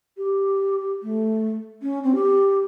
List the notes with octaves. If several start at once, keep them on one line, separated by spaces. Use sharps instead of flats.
G4
A3
C#4
C4
G4